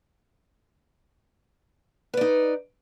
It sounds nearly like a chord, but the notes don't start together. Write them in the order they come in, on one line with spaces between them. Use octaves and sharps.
B4 D5 D#4